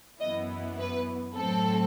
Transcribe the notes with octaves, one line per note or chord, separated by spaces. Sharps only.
F#2 E3 B3 E4 D#5
B4
A2 F#3 C4 A4